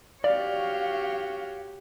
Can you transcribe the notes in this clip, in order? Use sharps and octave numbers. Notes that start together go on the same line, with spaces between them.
F#4 G4 C#5 D5 F5